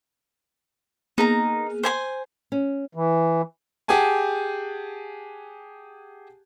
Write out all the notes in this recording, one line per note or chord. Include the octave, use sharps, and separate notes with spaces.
A#3 B3 D#4 G#4 A#5
C5 G#5 C6
C#4
E3
G4 G#4 F#5 G#5 A5